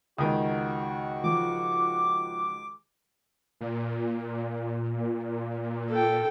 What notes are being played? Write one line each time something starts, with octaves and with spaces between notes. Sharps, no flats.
C#2 D#3 F#4 D#6
F3 D6
A#2
A4 G5